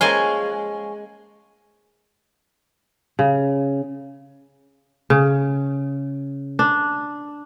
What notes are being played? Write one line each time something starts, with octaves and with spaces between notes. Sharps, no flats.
F3 G#3 A#3 C#4 G#5 C6
C#3
C#3
D4